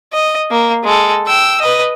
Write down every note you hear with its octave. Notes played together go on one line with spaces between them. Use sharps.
D#5
A#3
G#3 A4
G5 E6
B4 D#5